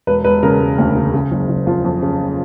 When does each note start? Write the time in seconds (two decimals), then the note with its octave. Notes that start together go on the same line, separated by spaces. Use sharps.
0.07 E1 B4
0.24 E1 B4
0.43 C#3 A#4
0.60 E1
0.78 D2
0.96 C#3
1.14 C#3
1.31 F#1
1.49 F#1
1.67 F2 F4
1.85 F2
2.02 C#3